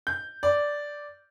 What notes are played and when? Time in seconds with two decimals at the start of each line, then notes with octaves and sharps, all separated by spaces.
0.07 G6
0.43 D5